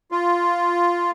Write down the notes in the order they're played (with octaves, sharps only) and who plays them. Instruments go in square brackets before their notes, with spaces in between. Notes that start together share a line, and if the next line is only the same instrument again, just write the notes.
[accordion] F4